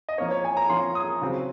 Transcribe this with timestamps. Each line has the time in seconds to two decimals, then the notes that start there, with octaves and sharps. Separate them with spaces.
0.09 D#5
0.18 F3 A#3 C#4 C#5
0.31 C#5
0.45 G#5
0.57 A#5
0.70 F3 A#3 C#4 C6
0.95 D#6
1.21 C#3 F#3 C4